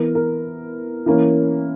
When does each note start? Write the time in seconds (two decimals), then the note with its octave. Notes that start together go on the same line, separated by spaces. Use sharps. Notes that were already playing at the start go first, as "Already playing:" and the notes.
Already playing: E3 B3 A#4
0.15 A#4
1.06 E3 A#3 C#4